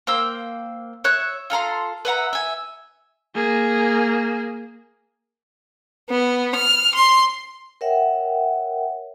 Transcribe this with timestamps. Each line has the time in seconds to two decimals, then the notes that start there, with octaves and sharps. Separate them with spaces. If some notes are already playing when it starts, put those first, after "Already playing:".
0.07 A#3 C5 G5 E6
1.04 C#5 E5 F#6
1.50 F4 A4 A#5 C6
2.05 B4 E5 F#5 A#5
2.33 E5 G#5
3.35 A#3 G#4
6.10 B3
6.55 F6
6.95 C6
7.81 A#4 C#5 E5 F#5 G5